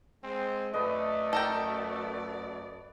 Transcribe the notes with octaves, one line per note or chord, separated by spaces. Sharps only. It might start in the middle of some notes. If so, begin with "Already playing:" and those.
G#3 C4
F#2 A3 B4 D5 D#5
A4 A#4 G5